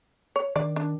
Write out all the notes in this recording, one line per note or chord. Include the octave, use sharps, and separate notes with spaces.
C#5
D#3 D4 D5
D4